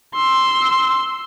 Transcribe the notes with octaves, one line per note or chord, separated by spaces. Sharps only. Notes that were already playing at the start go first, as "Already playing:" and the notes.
C6 E6